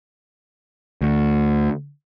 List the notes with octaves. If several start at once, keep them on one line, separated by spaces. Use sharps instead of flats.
D2